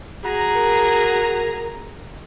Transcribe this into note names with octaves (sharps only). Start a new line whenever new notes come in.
F#4 G#4 A#5
A#4